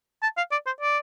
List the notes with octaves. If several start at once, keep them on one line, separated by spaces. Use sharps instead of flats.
A5
F5
D5
C5
D5